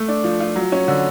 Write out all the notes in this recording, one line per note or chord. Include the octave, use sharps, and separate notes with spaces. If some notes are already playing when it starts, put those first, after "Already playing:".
Already playing: A3
D4
F3
F4
F#3
C#4
D3